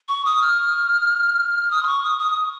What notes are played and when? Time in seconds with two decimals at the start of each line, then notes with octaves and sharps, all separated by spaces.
0.09 C#6
0.25 D#6
0.41 F6
1.71 D#6
1.83 C6
1.87 C#6
2.04 D#6
2.19 D#6